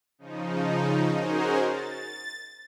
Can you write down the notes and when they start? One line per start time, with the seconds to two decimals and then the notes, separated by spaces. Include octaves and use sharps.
0.18 C#3 F3 D#4
1.12 C#4 D#4 F#4 G#4 A#4 C5
1.63 A6